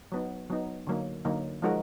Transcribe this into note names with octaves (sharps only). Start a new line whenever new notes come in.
F#3 B3 D#4
F#3 B3 D#4
D3 F#3 A#3 D#4
D3 F#3 A#3 D#4
F3 G#3 D#4 F#4 A#4